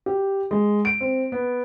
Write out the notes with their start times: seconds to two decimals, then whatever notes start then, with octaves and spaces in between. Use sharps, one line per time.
0.06 G4
0.51 G#3
0.85 D7
1.01 C4
1.32 B3